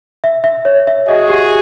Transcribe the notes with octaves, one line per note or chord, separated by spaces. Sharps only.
E5
E5
C#5
E5
F#4 G#4 D#5
G4